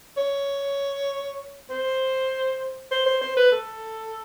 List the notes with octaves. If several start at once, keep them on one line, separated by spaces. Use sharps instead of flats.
C#5
C5
C5
C5
C5
B4
A4